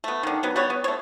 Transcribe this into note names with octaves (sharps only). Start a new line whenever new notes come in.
A3 B3
D3 D#3
F#3 B3
G3 B3 C#5
B3
A3 C#5